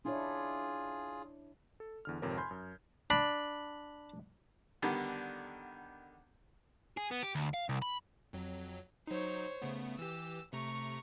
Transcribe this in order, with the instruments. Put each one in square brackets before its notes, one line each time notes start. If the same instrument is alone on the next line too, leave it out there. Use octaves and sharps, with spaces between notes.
[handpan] D4 E4 C#5 [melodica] F4 G#4
[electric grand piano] A4
E2 D3 F6
G#1 F2 C3 A#4 C#5
G#5 B5 C6 G6 G#6
F#2
[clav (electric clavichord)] D4 [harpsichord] B5
[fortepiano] D3 D#3 G3 B3
[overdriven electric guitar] G#4
B3
G4
D2
F5
C2
B5
[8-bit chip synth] F2 F#3
[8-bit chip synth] F#3 D#4 [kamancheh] C5 C#5
[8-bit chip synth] C#3 A3 B3
[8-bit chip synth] E3 G4 [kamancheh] E6
[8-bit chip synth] C3 A3 A#5 [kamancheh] C#6